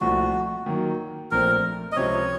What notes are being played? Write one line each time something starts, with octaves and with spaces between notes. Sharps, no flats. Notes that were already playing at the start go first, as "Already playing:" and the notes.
C2 A#2 F3 A3 F#4
D#3 F#3 A#3
A#1 A#2 A3 C4 A#4
D#5
C#2 C3 F3 C4 C#5